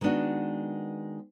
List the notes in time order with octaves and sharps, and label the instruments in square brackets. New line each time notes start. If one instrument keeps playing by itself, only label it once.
[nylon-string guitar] D#3 G#3 B3 D4 F#4